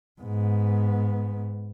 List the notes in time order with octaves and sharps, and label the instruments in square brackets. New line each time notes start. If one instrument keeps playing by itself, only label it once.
[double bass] G#2 B3